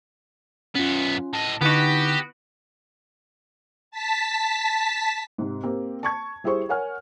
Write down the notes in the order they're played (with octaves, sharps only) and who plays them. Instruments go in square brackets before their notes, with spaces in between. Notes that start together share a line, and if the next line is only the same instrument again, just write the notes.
[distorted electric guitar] F#2 B3 [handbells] C#4 F4
[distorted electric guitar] A2 D#5 [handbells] A5
[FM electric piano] D3 D#4 [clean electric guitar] B3 F#4 [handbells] E4 B4 [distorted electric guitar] G4
[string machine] A5 B6
[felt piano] G#2 C3
A#3 C4 G4 A#4
A5 C#6 G#6
G3 E4 G#4 C5 C#6
A#4 C#5 F#5 G#5 F6